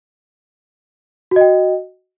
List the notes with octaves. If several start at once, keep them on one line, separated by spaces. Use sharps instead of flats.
F#4 D#5 G5